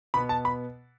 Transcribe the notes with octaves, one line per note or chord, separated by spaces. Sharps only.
B2 B3 B5
A5
B5